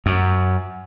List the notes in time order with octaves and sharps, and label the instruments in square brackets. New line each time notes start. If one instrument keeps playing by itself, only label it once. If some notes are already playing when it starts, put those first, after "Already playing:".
[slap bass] F#2